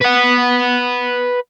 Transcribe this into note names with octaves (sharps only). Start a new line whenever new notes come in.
B4 F#5